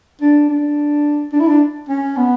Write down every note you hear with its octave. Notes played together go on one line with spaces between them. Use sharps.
D4
D4
D4
E4
D4
C#4
B3